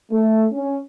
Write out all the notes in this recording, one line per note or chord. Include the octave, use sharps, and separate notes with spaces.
A3
C#4